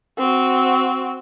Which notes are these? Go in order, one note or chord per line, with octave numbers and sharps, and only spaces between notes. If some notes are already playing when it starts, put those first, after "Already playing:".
C4 F#4